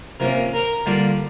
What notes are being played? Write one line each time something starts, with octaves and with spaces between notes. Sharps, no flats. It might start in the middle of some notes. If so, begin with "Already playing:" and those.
C3 F3 A#3 C#4 A#4
A#4
D3 G3 A#3 D4 F4